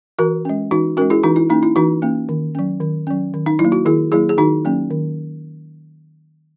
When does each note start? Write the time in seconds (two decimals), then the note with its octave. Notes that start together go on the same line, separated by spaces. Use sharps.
0.19 E3 F#4 A#4
0.45 G#3 C#4
0.71 E3 D#4 F#4
0.97 G#3 C#4 F#4 A#4
1.10 E4 G#4
1.23 E3 D#4 F#4
1.36 E4
1.49 A#3 C#4 D#4
1.63 E4
1.76 E3 D#4 F#4
2.02 A#3 C#4
2.29 D#3
2.55 F#3 C#4
2.81 D#3
3.07 F#3 C#4
3.34 D#3
3.46 D#4
3.59 F#3 E4
3.65 A#3
3.72 F#4
3.86 D#3 E4 G#4
4.11 F#3 A#3 E4 G#4
4.29 G#4
4.38 D#3 D#4 F#4
4.65 F#3 A#3 C#4
4.91 D#3